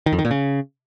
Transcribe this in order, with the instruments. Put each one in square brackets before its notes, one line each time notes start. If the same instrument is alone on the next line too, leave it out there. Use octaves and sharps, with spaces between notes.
[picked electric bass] D#3
F2
D#3
A#2
C#3